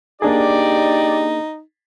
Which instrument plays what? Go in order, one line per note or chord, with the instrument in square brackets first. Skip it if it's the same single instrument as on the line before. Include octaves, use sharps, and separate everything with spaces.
[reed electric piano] A#3 D4 G#4 [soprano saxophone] D#4 [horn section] G4 D5